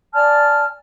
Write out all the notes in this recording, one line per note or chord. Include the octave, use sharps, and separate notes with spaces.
D5 G#5 A5 F6